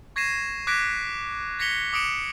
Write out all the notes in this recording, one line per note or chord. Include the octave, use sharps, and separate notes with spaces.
C#6 G#6 A#6 C7 D#7 E7
D6 F#6 G#6 A#6 B6 D7
G#6 A#6 B6 C#7 F7 G7
D6 D#6 C#7 D7 E7 F#7